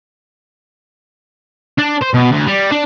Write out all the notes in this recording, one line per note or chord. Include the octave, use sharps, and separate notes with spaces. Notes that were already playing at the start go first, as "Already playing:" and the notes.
D4
C5
B2
D2
G3
D4